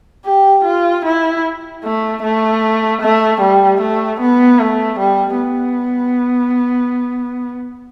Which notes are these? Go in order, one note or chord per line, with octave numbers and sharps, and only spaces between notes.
G4
F4
E4
A3
A3
A3
G3
A3
B3
A3
G3
B3